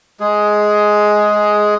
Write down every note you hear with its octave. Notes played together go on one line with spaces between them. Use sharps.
G#3 G#4